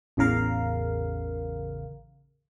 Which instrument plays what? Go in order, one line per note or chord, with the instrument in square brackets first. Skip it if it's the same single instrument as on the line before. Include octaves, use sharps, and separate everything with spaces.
[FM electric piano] A1 E2 C#3 A#4 F5